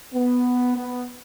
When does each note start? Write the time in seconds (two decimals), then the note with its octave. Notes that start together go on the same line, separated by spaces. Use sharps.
0.14 B3
0.76 B3